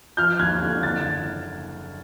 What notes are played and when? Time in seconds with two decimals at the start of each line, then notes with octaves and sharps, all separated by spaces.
0.17 F3 F6 G6
0.39 D#2 F#6 G#6
0.62 D3
0.83 F#1 A6